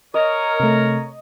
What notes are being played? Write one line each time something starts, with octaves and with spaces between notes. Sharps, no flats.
A#4 C#5 D#5
C3 A3